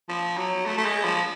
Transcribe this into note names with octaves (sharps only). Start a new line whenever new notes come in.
F3
F#3
A3
A3
G#3
F3